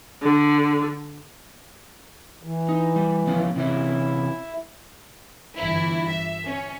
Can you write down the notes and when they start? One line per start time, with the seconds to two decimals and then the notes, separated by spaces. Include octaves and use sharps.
0.22 D3
2.43 E3
2.69 D#4
2.96 G3
3.27 F3 B3 C#4
3.56 C3 E3 C#4 E4
5.56 G1 E3 E4
6.07 E5
6.46 C#4